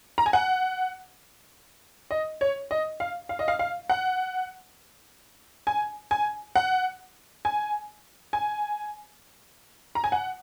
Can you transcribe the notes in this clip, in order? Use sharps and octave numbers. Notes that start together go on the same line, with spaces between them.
A#5
G#5
F#5
D#5
C#5
D#5
F5
F5
D#5
F5
F5
F#5
G#5
G#5
F#5
G#5
G#5
A#5
G#5
F#5